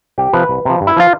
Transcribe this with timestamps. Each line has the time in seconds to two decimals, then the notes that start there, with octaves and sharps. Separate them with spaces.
0.18 C2 G4
0.33 C3 F3 B4
0.49 C2
0.65 C3 F3
0.81 G2
0.87 E4
0.97 F3 F4